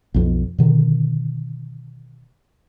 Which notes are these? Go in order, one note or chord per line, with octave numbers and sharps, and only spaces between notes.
B1 F2 B2
B2 D3 D#3